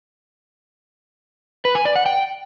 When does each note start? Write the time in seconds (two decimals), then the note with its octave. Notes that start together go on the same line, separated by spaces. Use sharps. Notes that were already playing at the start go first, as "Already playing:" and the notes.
1.65 B4
1.75 G#5
1.85 D5
1.96 F#5
2.06 G5